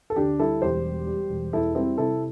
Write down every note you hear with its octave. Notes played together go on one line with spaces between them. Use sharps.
A4
D2 D4 G4
G3 E4 A4
E1 G4 C5
G3
G3
E1
E2 E4 A4
G3 C4 E4
C3 E4 A4